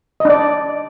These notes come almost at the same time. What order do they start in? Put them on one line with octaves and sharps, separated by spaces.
D#5 D4 D5